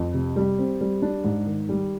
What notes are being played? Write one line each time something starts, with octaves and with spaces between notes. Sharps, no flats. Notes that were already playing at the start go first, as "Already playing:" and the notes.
Already playing: F2
C3
G3
C4
G3
D4
G#2
D#3
G3